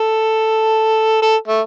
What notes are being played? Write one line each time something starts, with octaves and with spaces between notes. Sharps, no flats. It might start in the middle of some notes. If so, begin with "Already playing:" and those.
Already playing: A4
A4
A3